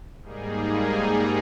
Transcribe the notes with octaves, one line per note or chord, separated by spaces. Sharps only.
G#2 G3 A#3 D#4 G#4